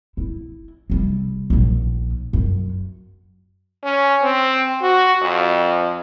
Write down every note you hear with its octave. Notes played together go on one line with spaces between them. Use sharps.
E4
C3 G3
A#1 D#2
F#2
C#4
C4
F#4
F2